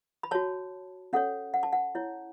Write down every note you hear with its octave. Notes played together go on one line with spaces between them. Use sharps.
B5
F#4 C#5 A5
C#4 A4 C#5 F#5
F#5
A5
F#5
E4 C#5